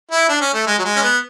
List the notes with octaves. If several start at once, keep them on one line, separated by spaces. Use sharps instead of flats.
E4
D4
C#4
A3
G#3
F#3
G#3
C#4
B3